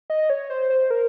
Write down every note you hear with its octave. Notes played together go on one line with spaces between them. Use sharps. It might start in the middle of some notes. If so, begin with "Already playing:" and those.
D#5
C#5
C5
C5
A#4